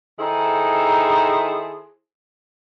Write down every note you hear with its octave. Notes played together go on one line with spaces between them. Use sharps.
D#3 D#4 E4 G#4 A4 C5